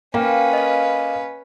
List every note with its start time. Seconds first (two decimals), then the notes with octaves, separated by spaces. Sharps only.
0.14 A#3 C#4 B4 F5 G5
0.53 D#5 F5